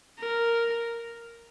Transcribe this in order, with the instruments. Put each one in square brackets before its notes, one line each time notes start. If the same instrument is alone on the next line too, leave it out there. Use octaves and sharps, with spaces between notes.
[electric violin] A#4